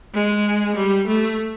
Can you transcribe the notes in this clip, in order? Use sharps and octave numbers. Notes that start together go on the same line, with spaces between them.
G#3
G3
A3